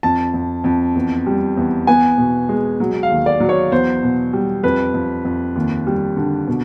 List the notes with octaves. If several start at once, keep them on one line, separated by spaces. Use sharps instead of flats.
F2 A5
F2
F2
E2
G3
E2
B3 G#5
B2
G#3
F#3
F5
D#2
D5
F#3
C#5
E2 C5
B2
G3
F2 B4
F2
F2
D#2
G3
D3
B2